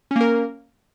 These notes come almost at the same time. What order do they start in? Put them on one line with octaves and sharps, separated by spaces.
C#4 A#3 A#4